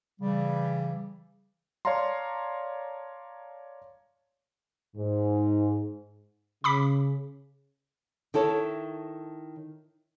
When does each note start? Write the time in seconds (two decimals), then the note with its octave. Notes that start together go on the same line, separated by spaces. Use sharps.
0.21 C#3 E3 G3
1.85 C#5 D5 F5 A5 A#5 C6
4.95 G#2
6.64 C#3 B5 D6 B6
8.34 D#3 E4 A4 C#5